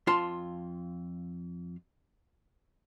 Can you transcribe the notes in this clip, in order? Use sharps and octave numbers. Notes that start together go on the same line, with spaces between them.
F2 F4 A5 C6